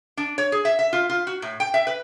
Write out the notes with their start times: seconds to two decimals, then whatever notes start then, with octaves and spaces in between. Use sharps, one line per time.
0.17 D4
0.38 C#5
0.52 G#4
0.65 E5
0.79 E5
0.93 F4
1.10 F4
1.27 F#4
1.42 A2
1.60 G5
1.74 E5
1.87 B4